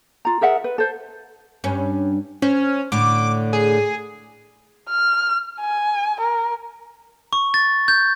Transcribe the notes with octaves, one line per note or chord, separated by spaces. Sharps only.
F4 A#5
G#4 A#4 E5 F#5
B4
A4 C5
G2 C#4
C#4 C5
A2 D3 D6
G#4
F6
G#5
A#4
C#6
A6
G6